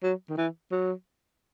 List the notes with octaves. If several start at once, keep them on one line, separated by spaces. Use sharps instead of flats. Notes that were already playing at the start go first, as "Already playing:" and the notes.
F#3
D#3
E3
F#3